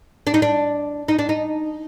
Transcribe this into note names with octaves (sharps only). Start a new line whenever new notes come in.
D4
D#4
D4
D#4
D4
D#4